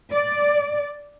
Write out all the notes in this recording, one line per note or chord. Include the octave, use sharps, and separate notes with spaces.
D5